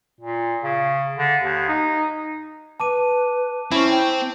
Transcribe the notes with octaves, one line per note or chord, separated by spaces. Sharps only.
A#2
C#3
D3
D#2
D#4
B4 A5 D6 D#7
C4 C#4 E4
G5